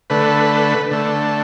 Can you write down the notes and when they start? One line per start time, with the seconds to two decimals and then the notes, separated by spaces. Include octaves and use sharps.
0.10 D3 A3 B4
0.91 D3 A3